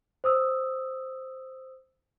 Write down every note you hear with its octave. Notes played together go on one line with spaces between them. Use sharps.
C5 D#6 E6